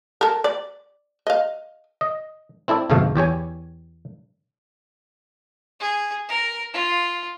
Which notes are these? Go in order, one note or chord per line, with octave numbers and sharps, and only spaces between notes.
A4 A#4
D5
D#5 F5
D#5
C4 E4 A4 D5
G1 F2 G#2 B2 A3 F5
E2 G4 C#5 G#5
G#4
A#4
F4